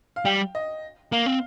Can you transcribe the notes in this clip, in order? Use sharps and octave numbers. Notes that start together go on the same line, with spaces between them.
F5
G3 G5
D#5
A#3 F5
C4